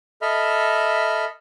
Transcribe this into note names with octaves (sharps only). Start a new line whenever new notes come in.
A4 D#5 E5 B5 F6